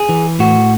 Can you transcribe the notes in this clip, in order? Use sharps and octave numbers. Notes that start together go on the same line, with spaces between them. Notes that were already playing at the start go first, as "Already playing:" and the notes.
Already playing: G#4
E3
A2 F#4